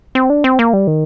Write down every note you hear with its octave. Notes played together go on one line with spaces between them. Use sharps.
C4
D4
C4
A#3
G3
D#3